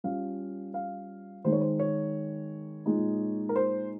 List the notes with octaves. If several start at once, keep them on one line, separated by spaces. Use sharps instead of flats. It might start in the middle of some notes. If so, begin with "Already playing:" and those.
G3 C#4 F4 F5
F5
D#3 G#3 D#4 C5
C#5
C5
C#5
A#2 G#3 D#4
A#4
C5